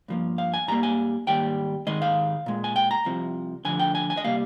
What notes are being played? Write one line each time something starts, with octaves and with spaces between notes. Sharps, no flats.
G2 F3 A#3
F5
G#5
G#2 G3 A#3 A#5
G#5
G#2 D#3 G3 A#3 G5
G#2 D#3 G#3 D#5
F5
A#2 G#3
G#5
G5
A#5
C2 C3 F3
D2 D3 F3 G#5
G5
G#5
G#5
D#5
C3 G3 A#3 F5